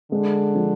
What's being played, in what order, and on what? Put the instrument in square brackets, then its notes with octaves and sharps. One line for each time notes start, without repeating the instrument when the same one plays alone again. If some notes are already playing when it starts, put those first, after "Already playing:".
[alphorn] D3 [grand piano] G#3
[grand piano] F3